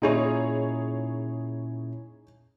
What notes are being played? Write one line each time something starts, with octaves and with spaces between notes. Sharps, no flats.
A#2 C#4 D#4 E4 G#4 C#5